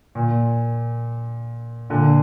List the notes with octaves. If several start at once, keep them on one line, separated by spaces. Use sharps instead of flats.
A#2
A#2 D3